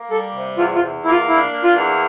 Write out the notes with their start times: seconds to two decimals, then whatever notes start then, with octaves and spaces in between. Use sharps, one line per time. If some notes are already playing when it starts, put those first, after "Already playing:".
Already playing: A#3
0.10 G3 A4
0.34 C3
0.58 E2 F4
0.75 F4
0.82 E2
1.04 A#3 E4
1.11 F4
1.28 D4 E4
1.52 A#3
1.64 F4
1.75 E2